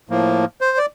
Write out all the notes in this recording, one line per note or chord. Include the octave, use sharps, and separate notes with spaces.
A2 F3 A#3
C5
D5